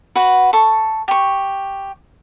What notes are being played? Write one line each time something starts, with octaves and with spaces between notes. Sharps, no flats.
F#4 B4 F#5
A4 C#6
G4 C#6